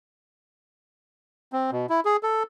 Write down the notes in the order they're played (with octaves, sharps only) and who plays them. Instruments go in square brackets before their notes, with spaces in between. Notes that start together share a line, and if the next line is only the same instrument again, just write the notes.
[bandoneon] C4
B2
E4
G#4
A4